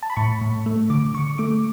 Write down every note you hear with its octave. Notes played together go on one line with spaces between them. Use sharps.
A5
B5
A2 C#6
A2
A3
D3 D6
D3 C#6
A3 D6